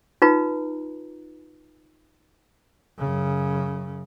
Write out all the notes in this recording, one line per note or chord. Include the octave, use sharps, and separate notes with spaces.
D#4 F4 B4 A#5
F#2 C#3